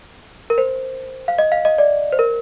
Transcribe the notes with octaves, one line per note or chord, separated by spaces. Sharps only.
A#4
C5
F5
D#5
F5
D#5
D5
C5
A#4